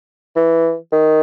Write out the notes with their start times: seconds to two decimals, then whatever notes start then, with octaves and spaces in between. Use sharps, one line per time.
0.36 E3
0.92 D#3